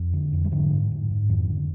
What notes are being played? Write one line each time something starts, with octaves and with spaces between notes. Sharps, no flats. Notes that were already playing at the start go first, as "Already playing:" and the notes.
Already playing: F2
D3
F2
G3
G#2 D3 F3
G#2
G#2
G#2
F2 D#3
D3